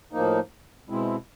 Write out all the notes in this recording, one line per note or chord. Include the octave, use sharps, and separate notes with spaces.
A2 F3 A#3 D#4
B2 G#3 C4 E4